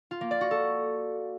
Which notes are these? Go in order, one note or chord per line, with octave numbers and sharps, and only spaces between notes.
F4
A#3
D5
F#4
A4